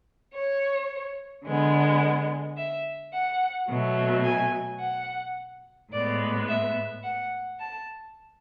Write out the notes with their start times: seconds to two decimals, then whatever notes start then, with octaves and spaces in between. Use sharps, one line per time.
0.33 C#5
1.45 D3 G#3 B3
2.57 E5
3.12 F#5
3.68 B2 F#3 A3
4.24 G#5
4.80 F#5
5.92 A2 G#3 B3 D5
6.48 E5
7.03 F#5
7.59 A5